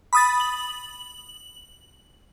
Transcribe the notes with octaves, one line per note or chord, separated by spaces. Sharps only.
B5 D#6 A6
F#7